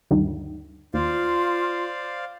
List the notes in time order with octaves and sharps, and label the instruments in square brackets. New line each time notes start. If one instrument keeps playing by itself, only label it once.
[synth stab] D2 G2 D#3
[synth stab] D#2 [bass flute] F4 [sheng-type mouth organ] C5 D5 F5